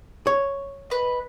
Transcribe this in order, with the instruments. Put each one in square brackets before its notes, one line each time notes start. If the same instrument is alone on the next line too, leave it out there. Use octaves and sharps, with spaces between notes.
[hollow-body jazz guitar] C#5
[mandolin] B4 D#5